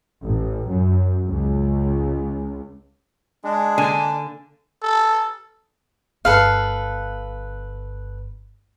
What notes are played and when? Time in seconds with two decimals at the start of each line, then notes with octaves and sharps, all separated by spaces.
0.22 A1
0.68 F#2
1.27 C#2
3.44 G#3 D4
3.78 D3 A#3 G#5
4.83 A4
6.25 G1 A4 B4 F5